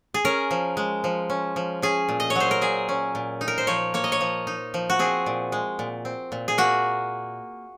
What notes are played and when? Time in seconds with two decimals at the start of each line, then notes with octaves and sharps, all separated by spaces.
0.14 G#4
0.25 C#4 A#4
0.51 F3
0.77 G#3
1.04 F3
1.30 C#4
1.56 F3
1.82 C#4 G#4
2.09 A#2
2.20 D#5
2.30 C#5
2.35 F#3 C5
2.51 A#4
2.61 A#2 G#4
2.89 C#4
3.15 A#2
3.41 D#4
3.48 A#4
3.58 C5
3.67 F3 C#5
3.94 A#3 C#5
4.04 D#5
4.12 C#5
4.21 F3
4.47 D#4
4.74 F3
4.90 F#4
4.99 C4 G#4
5.26 A#2
5.52 G#3
5.79 A#2
6.05 C4
6.32 A#2
6.48 G#4
6.58 A#3 F#4